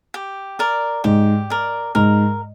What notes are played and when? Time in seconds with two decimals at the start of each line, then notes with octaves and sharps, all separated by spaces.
0.14 G4
0.59 A#4 D5
1.04 G#2 G4
1.50 A#4 D5
1.95 G#2 A#4